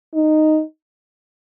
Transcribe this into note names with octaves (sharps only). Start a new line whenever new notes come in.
D#4